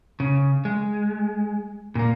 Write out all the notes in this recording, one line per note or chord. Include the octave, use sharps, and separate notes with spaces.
C#3
G#3
A#2 A#3